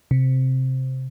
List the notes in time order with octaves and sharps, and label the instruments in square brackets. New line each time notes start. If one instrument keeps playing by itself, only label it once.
[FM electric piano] C3